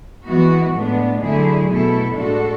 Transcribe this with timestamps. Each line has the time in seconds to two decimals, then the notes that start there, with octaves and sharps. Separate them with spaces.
0.26 E3 G#3 B3 F#4
0.74 A2 G#3 B3 D4
1.21 D3 F#3 A3 E4 G#4
1.69 B2 A3 E4 A4
2.16 A2 G#3 D4 F#4 A4